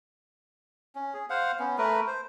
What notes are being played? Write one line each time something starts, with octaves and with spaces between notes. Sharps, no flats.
C#4
G#4
C5 F5 F#5
B3 C#4
A3 A#4 B4
C5